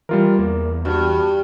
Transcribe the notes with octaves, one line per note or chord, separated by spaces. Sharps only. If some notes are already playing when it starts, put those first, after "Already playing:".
E3 G3 F4 A#4
E2 A#3
G2 F#4